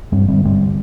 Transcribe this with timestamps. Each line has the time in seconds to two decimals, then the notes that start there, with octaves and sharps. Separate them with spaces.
0.12 G2 G3 C4
0.28 D3 G3 C4
0.45 G2 G3 C4
0.61 D3